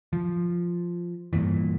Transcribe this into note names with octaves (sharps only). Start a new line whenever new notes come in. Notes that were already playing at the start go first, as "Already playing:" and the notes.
F3
G2 A#2 E3